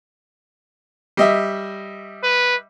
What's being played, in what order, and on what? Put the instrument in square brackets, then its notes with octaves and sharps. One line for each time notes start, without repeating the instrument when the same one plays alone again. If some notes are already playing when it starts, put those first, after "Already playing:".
[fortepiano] G3 D#5 E5
[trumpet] B4